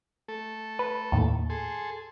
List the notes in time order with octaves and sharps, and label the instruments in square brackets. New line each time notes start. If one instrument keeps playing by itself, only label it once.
[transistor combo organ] A3 A4
[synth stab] B4
D#2 A2
[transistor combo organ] G#4 A4 C6